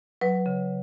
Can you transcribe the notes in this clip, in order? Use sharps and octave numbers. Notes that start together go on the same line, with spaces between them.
F#3 B4
C#3